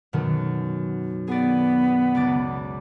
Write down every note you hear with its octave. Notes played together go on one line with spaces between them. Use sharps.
F#2 B2 D#3
B3 G#4 D5
C#2 D6 A6